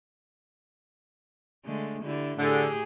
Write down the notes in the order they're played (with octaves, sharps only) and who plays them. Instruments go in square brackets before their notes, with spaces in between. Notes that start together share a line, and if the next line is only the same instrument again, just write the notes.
[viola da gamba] D3 G#3 A3
D3 E4 G4
[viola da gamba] A2 G4 G#4 [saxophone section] D3